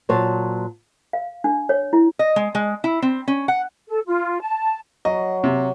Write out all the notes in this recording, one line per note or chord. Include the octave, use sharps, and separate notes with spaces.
A#2 F#3 C5 C#5 A5
F5
D4
C#5
E4
D#5
G#3
G#3
E4
C4
C#4
F#5
A4
F4
A5
F#3 D#5
C3